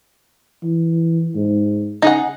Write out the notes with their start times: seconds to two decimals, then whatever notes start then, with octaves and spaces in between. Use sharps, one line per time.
0.63 E3
1.36 G#2
2.02 C#3 D#4 G#4 F#5